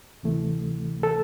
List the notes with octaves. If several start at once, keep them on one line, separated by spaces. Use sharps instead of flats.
D2 C3 E3 A3
A4